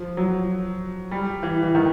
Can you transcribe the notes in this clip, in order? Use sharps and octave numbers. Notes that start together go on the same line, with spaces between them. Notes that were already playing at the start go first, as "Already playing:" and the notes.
Already playing: F3
F#3
G3
E3
E3
D#3